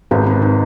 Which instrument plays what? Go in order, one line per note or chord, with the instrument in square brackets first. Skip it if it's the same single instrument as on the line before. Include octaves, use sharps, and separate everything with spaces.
[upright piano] G#1 G#2 [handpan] B4
[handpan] C4
D#4